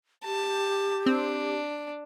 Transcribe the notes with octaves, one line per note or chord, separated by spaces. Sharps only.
G4 A5
C4 D4